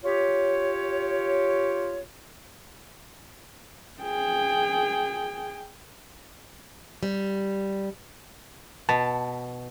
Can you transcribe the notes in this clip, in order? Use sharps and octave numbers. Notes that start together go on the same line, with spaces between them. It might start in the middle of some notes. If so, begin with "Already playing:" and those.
F4 G4 C#5
G#4 G5
G3
B2 A5